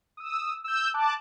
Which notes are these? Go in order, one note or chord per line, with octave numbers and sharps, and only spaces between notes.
D#6 E6
E6 G6
A5 D6 F#6